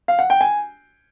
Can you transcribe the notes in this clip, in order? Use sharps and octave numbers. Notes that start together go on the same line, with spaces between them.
F5
F#5
G5
G#5